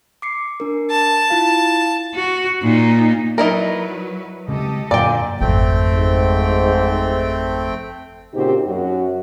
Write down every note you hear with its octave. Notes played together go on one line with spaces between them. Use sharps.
D6 C7 C#7
D4 A#4
A5
E4 F4 F5
F#4
A#2 D#4
F#3 D#4 E4 A#4 B4 D5
C#3 G#3 C4 G4 A4 D#5
F#2 A#2 D3 F#3 D5 G5
G#1 F2 A3 C4 G5
G#2
A#2 C#3 C4 D#4 F#4 G4
F#2 F#4